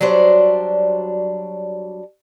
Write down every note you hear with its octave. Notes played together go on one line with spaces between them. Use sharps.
F#3 G3 D4 C5